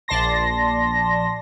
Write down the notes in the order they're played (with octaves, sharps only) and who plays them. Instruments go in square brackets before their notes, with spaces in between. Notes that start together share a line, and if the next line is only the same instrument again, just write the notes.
[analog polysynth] A#1 D5 A5 C6 A#6